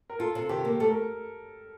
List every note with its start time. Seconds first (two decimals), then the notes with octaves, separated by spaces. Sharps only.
0.10 A#4
0.19 F4 A4
0.35 C3 A4
0.49 D#3 G4
0.65 A#3
0.80 A3 A4
0.90 A#4